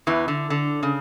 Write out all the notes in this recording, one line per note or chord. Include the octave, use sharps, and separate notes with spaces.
E2 E3
D3
D3
C#3